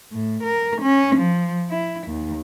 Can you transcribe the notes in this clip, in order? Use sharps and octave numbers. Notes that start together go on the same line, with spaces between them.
A2
A#4
C#4
F3
E4
D#2